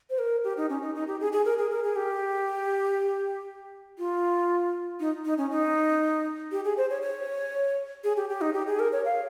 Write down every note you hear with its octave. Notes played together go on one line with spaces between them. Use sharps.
C5
A#4
G4
D#4
C#4
D#4
D#4
G4
G#4
G#4
A#4
G#4
A#4
G#4
G4
F4
D#4
D#4
C#4
D#4
G4
G#4
C5
C#5
C#5
G#4
G4
G4
D#4
G4
G#4
A#4
C#5
F5